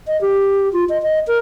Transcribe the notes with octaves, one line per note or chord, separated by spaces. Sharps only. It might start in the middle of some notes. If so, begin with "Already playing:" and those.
D#5
G4
F4
D#5
D#5
A#4